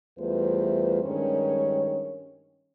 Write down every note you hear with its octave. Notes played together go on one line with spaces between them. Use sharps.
E2 G3 A3 F4 B4 C5
G2 D#3 G#3 C#4 A#4 C#5